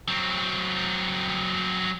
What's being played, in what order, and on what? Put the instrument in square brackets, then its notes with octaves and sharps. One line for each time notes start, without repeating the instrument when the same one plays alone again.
[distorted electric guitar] F#3 C4